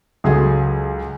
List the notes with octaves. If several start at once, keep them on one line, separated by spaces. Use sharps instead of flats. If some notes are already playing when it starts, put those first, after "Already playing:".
C#2 F#3 G#4 A4 G#5